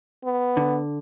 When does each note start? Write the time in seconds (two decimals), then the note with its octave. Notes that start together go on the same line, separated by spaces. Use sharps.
0.25 B3
0.57 D3